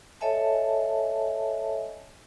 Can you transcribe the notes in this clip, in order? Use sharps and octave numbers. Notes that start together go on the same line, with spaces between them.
A4 C#5 D#5 E5 G#5 A5